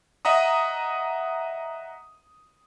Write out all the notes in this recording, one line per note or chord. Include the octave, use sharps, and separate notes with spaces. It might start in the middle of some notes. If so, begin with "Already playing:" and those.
D#5 E5 F#5 A#5 D#6